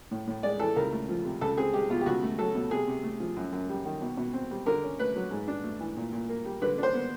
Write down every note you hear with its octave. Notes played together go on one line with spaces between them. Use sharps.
A2
A2
G#3 D5
E3 A4
C#2 A#4
A3
F3
C3
C#2 A4
C4 G#4
G#3 G4
B2 F4
G4
C#2 F#4
A3
F#3 A4
B2
C3 G#4
C3
A3
F3
F#2
F#2
G3
D#3
B2
B2
C4
G3
D3 A#4
C#4
A3 B4
F#3
G#2
D4
A3
E3
A#2
A#2
A#3
G3
D3 B4
D4 C5
B3